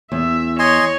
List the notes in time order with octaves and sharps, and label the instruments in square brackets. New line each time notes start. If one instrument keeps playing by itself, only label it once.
[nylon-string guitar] E2 [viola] E5
[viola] C#5 [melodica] D#5 G#5 C6